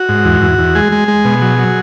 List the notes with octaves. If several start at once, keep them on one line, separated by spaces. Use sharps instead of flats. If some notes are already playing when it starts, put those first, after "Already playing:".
Already playing: F#4
G#2
E2
E2
E2
G#3 G#4
G#3
G#3
B2
F#3
F#3